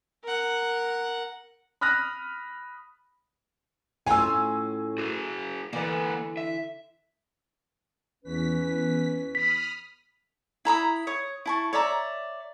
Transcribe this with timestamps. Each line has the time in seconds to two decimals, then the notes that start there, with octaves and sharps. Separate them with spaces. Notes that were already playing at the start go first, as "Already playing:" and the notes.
0.23 A#4 F#5
1.81 B5 D#6 F6 F#6 A#6
4.06 A2 C#4 F4 G#5 E6
4.98 F#4 G#4
5.73 D3 E3 A#3 B4 D5
6.37 E5
8.24 E2 C#4 B4 B6
9.35 B5 D#6 F6 B6
10.65 E4 A#5 B5 D#6
11.07 C#5 D#6
11.46 E4 A5 C#6
11.73 C#5 D5 E5 A#5